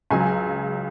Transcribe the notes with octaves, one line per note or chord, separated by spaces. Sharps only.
C#2 C#3 F#3 G#5